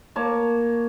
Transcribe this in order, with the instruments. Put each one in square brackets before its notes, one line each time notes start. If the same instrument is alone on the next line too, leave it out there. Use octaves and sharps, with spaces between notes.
[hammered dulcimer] A#3 C#5 A5